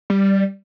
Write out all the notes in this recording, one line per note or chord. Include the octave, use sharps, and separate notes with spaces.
G3